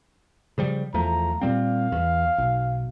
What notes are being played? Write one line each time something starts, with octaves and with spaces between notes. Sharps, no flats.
C#3 F3 G3
E2 F3 A3 A#5
A#2 G3 C4 F5
E2
B1